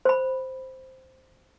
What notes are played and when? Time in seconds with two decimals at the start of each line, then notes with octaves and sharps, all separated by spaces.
0.05 C5 B5